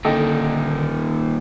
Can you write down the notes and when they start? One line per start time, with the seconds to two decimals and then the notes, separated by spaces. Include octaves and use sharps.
0.05 A#2 D3 D#3 A4 D#5 G5